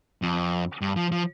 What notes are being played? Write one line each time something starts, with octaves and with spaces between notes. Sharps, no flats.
F2
G2
F3
F3